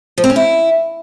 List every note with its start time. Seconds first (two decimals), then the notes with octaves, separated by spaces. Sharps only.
0.18 F3
0.24 C4
0.30 C#4
0.36 E4